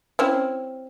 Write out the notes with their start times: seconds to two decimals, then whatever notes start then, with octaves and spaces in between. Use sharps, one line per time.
0.19 C4 C#4 E4